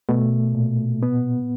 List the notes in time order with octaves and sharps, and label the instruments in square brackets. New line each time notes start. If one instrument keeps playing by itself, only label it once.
[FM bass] B2 [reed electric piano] A3
[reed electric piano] A#2
B3